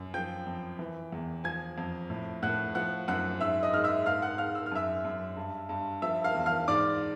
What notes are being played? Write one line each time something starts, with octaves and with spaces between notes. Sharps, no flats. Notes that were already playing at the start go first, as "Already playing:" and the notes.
Already playing: F#2
F3 G5 G6
F2
E3
E2
F3 G#5 G#6
F2
A2
A2 F#5 F#6
F3 F#5 F#6
F#2 F#5 F#6
G#2 E5 E6
D#5 D#6
G#2 F6
E5 E6
G#2 F5 F6
F#5 F#6
G#2 F5 F6
E6
F6
F#2 E5 E6
F#2
G2
G2
F3 E5 E6
F5 F6
E2
F5 F6
G#2 D5 D6